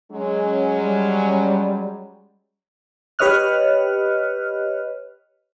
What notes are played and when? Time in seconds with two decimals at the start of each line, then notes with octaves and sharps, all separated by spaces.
0.12 F#3 G#3 C#4
0.76 G3
3.19 G4 B4 C#5 D#5 F6 F#6